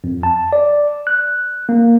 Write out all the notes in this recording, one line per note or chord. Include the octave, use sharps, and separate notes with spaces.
F2
A5
D5
F#6
A#3